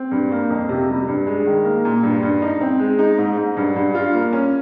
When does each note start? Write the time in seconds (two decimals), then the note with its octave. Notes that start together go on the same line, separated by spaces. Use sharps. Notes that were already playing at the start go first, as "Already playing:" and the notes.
Already playing: C4
0.11 G2
0.31 A#3
0.50 F2
0.69 C3
0.89 G3
1.08 G2
1.27 G#3
1.46 D#3
1.64 A#3
1.85 A#2
2.03 G2
2.23 G2
2.42 D#4
2.61 C4
2.79 G#3
2.99 D#4
3.18 G#2
3.37 G#2
3.57 G2
3.76 G2
3.95 F4
4.14 A#3
4.33 C#4